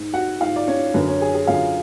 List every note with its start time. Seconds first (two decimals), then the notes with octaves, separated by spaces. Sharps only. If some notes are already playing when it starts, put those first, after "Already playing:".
Already playing: G#2
0.13 F#4 F#5
0.40 G#2 F4 F5
0.56 D5
0.67 C#4 C#5
0.94 F#2 D3 B4
1.08 C#4 C#5
1.22 G#4 G#5
1.34 G#4 G#5
1.47 F#2 D3 F4 F5